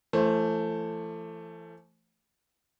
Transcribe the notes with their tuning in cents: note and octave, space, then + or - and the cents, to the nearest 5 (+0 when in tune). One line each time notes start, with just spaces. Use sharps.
E3 +40 A3 +10 C5 +25